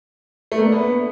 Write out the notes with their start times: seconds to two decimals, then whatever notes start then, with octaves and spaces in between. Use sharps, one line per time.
0.52 A3
0.58 A#3
0.65 D4
0.72 B3